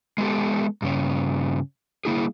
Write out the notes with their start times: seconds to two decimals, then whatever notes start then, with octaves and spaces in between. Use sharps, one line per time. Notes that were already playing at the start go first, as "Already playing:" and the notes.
0.18 G#3 B3 G4 A4
0.82 G2 C#3 C#5
2.05 G3 A#3 E4 G#4